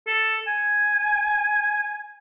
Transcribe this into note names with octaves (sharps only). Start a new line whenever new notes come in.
A4
G#5